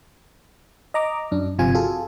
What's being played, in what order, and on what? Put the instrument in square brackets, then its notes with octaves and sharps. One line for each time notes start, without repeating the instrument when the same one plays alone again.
[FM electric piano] D#5 A#5 D6
F#2 D4
G1 C3 F3 F4 G#5
F4 F#4 G#4 A4